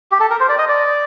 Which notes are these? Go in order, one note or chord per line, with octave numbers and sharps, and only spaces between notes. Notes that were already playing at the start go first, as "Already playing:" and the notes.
G4
A4
A#4
C5
D5
D#5
D5